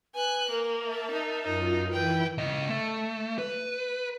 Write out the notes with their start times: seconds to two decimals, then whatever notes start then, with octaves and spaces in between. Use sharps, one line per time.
0.15 B4 G#5 F#6
0.51 A#3 A#4
0.79 E5 A5
1.12 D#4
1.45 F#2 D#4 F4
1.91 E3 E4 B4 G5
2.38 C#3 D#5
2.69 A3
3.39 B4